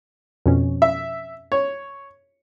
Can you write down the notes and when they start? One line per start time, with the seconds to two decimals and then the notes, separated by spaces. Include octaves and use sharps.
0.46 F2 B2 C#4
0.82 E5
1.52 C#5